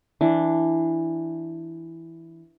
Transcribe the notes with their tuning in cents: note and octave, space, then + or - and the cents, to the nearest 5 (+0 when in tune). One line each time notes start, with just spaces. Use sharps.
E3 +0 D4 +0